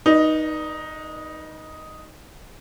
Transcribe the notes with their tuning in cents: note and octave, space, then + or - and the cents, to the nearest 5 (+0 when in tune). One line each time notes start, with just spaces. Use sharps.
D#4 +0 B4 -35 D5 +35